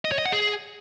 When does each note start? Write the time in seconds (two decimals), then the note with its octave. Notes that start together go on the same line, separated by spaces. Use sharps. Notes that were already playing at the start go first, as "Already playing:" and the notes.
0.05 D#5
0.12 C#5
0.19 D#5
0.25 F#5
0.32 G#4